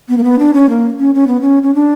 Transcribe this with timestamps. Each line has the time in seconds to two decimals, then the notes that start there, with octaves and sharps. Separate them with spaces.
0.09 B3
0.18 A#3
0.24 B3
0.39 D4
0.54 C#4
0.69 A#3
0.99 C#4
1.15 C#4
1.27 B3
1.41 C#4
1.63 C#4
1.75 D4